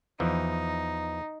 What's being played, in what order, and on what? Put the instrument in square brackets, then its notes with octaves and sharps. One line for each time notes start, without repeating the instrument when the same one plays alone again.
[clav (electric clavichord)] E2 E3 F3 [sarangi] D#4